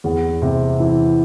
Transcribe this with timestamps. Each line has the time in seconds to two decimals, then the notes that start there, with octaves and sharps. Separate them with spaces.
0.04 E2
0.42 C3
0.80 E3